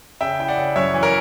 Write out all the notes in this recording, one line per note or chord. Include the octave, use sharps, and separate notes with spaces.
C#3 E5 G5
E4 G5
D5 F#5
C#3
F#2 C#5 E5
E3
A#4 C#5